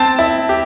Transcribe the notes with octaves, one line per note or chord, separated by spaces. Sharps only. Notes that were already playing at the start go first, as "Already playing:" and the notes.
Already playing: C4 A5
E4
G4